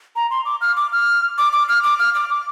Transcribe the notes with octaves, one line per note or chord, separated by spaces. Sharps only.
A#5
C6
D6
F6
D6
F6
D6
D6
F6
D6
F6
D6
D6